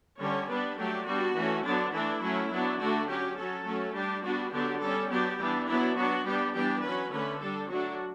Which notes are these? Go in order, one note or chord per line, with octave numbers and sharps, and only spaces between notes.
D3 G3 C#4 C#5
G3 B3 D4 B4
F#3 A3 D4 G4
G3 B3 D4 F#4
E3 A3 C#4
D3 F#3 B3 D4
E3 A3 D4 E4
F#3 A3 C#4
F#3 B3 D4
D3 A3 D4 F#4
F#3 C#4 G4
F#3 C#4 A4
F#3 A3 C#4
G3 D4 G4
G3 B3 D4 F#4
D3 F#3 B3 D4 G4
G3 C#4 A4
F#3 B3 D4 G4
E3 G3 B3 D4
F#3 B3 D4 E4
F#3 B3 D4 F#4
G3 B3 D4 G4
E3 G3 B3 D4 G4
F#3 C#4 B4
D3 A3 C#4 B4
G3 D4 A4
F#3 A3 D4 F#4